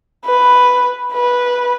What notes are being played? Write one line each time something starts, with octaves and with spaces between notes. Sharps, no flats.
B4
B4